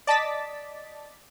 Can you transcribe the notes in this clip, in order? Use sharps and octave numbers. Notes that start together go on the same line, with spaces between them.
D5 D#5 A5 D6 A6 B6